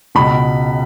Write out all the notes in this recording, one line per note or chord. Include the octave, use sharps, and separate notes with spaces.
C#2 B2 B5